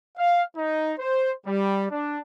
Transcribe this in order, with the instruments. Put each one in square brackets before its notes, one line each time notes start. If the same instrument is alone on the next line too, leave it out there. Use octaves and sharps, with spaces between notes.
[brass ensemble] F5
D#4
C5
G3
D4